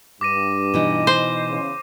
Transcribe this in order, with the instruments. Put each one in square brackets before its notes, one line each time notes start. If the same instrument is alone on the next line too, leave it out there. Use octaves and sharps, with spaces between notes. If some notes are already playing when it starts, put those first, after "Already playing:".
[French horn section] G2 [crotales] D6 A#6 D#7
[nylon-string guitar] B2 E3 D#4
[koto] C5
[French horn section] E2 C#3